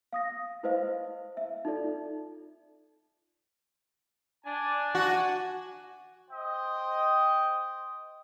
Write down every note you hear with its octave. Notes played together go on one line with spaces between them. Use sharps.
F5 D#6 A#6
E4 B4 C5 D#5 F5
E5
D#4 F4 A4 D5
D4 G#5 A5
F#4
C5 D#5 G5